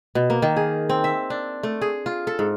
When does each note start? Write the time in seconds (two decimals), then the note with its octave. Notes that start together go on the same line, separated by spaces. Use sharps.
0.15 B2
0.30 A#3
0.42 D#3
0.56 G#4
0.90 C4
1.04 E5
1.30 D4
1.63 A3
1.81 G#4
2.06 F4
2.27 A4
2.39 G#2